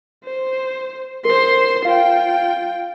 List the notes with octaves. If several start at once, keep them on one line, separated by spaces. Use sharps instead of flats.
C5
A#4 C5 C6
F4 F5 G5